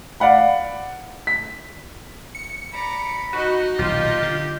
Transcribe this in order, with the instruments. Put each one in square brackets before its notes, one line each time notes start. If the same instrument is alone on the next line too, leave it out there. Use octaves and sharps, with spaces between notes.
[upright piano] D5 F5 F#5 B5
B6
[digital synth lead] C#7
[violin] D5 A#5 [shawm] B5
[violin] D#4 D#5 [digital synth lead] F#4
[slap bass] D#1 B1 [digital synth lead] F4 [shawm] G4
[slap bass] D3